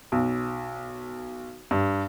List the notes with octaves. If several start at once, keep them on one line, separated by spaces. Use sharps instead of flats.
B1
G2